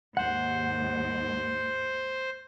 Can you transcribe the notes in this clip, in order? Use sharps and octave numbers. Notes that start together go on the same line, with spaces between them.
D#2 G#2 C5 F#5